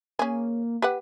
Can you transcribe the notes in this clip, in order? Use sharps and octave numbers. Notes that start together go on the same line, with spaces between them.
A#3 C#4 G#4
G4 B4 F#5